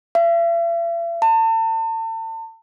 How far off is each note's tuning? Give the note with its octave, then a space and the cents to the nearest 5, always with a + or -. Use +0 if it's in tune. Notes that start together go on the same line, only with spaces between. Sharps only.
E5 +45
A5 +35